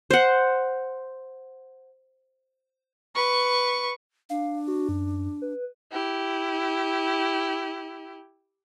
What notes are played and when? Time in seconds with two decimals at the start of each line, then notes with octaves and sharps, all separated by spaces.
0.11 C5 F#5
3.15 B4 C#6
4.30 D4 F5
4.68 F#4
4.89 F#2
5.42 B4
5.92 E4 G4